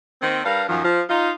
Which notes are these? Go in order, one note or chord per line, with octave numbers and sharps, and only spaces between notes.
D#3 A#3 C4
G3 D4 A#4 B4 F5
F#2 D#3 F3
F3
D#4 F4